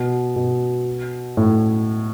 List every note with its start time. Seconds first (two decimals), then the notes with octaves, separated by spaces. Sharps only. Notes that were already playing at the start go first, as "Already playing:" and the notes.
Already playing: B2
0.36 B2
1.37 A2